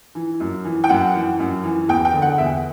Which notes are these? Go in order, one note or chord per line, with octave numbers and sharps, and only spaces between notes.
E3
F#2
E3
G5
F#2 F#5
E3
F#2
E3
E2 G5
G5
D3
F#5
E2 E5